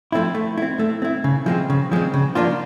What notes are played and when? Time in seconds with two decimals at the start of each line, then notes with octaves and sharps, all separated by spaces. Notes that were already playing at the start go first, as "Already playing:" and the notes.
0.12 F3 A3 C4 E4
0.35 A3
0.58 C4 E4
0.79 A3
1.02 C4 E4
1.24 C#3
1.46 F3 G#3 C4
1.70 C#3
1.92 F3 G#3 C4
2.14 C#3
2.35 F3 A#3 D4 F4